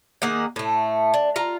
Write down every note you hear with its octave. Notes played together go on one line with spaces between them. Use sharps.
D#3 A#3 G#4 F#5
A2 A3
D4
F4 A#5